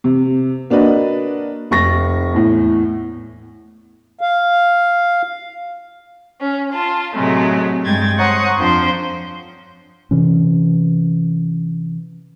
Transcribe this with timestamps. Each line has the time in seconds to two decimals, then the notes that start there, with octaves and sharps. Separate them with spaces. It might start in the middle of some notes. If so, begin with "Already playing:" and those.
0.04 C3
0.70 A#3 D4 F#4 B4 D#5
1.71 F1 C#6 A#6
2.34 E2 A2
4.21 F5
6.40 C#4
6.72 F4 A5
7.14 A2 C3 F#3 G#3 A3
7.85 G2 G3 G#3 G5 G#6 A6
8.18 C5 C#5 F#5 A#5 C#6 D#6
8.59 F2 F3 D4 F4 C5 G5
10.11 C3 E3 C#4